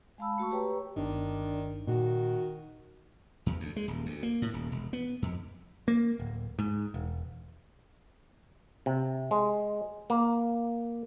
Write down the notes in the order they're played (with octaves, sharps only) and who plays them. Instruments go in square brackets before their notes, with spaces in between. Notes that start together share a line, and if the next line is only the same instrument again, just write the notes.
[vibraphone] G#3 F5 A5 B5 E6
A3 F#4 A5 C#6
G4 B4 C#5 G5 A#5
[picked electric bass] G1 [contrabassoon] D#3 [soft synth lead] D4
[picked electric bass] A#2 [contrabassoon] D#3 [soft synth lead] F#4
[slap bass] E2
D2
G#3
D#1
D2
A#3
A2
D#1
E1
B3
F2
[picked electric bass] A#3
D1
G#2
E1
[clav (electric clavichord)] C3
G#3
A#3